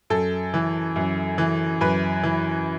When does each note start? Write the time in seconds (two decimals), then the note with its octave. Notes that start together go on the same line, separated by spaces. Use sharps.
0.10 F#2 A4
0.54 E3
0.96 F#2
1.38 E3
1.81 F#2 B4
2.23 E3